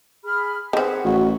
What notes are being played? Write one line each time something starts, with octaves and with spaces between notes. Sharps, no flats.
G#4 B5 F6
D#3 C4 G#4 B4 F#5
A1 F#4